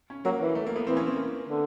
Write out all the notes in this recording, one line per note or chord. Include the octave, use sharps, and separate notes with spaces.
C#4
F#3 A#3
E3
A3
A#3
B3
E3 C4
C#4
C4
A#3
D3